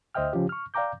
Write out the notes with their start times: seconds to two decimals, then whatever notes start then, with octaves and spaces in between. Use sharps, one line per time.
0.15 D2 C5 D#5 E5 G5 F6
0.33 C#3 F3 C#4 F4 G4
0.49 C#6 F6
0.74 D5 F5 G5 A#5 D6 G6